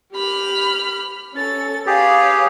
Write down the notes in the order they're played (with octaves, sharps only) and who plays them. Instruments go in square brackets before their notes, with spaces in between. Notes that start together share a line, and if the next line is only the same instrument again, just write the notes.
[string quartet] G4 B5 F6
C#4 A4 A6
[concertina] G4 G#4 [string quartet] B4 C#5 F5